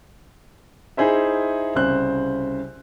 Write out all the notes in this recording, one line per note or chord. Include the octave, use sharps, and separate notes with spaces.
D#4 E4 G#4 C5 E5
C2 C#3 C5 F#6